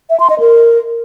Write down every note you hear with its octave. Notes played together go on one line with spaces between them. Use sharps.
E5
C6
D#5
A#4